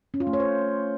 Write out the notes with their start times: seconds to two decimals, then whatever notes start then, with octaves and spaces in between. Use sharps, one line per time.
0.14 C#4
0.20 F4
0.27 A3
0.33 C#5
0.40 C5